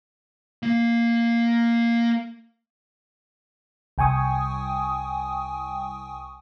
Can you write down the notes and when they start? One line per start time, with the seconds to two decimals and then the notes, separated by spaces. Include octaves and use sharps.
0.63 A#3 F5
3.98 C2 G5 G#5 C#6 D#6